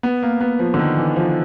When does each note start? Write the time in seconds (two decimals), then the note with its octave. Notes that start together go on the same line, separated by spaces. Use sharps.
0.03 B3
0.23 A#3
0.41 B3
0.59 F3
0.74 D3
0.79 D#3
0.97 E3
1.16 F3